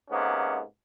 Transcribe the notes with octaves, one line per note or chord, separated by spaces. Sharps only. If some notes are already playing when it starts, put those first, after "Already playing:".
G#2 C3 A#3 B3 C#4